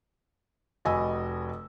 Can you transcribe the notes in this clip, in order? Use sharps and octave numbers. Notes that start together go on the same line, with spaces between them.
F1 F#4 D#5 G#5 B5 E6